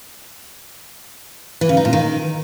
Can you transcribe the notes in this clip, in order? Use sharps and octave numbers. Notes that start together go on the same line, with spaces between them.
E3
C#3
D#4
A#2
D#3